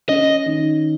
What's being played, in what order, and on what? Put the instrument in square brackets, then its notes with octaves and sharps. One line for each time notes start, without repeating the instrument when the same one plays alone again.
[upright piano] C#4 [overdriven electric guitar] D#5
[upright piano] D#3